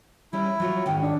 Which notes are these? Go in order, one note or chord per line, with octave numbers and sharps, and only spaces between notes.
G3 C#4 E4
F#3 F4 C#5
G#2 D#3 C#4 G5
D4